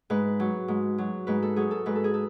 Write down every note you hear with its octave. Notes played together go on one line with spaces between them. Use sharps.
G#2 B4
F#3
G#2
F#3
G#2 B4
A4
F#3 G#4
A4
G#2 B4
A4
G#4
A4